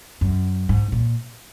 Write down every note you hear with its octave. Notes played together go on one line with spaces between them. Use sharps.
F#2
G#2
A#2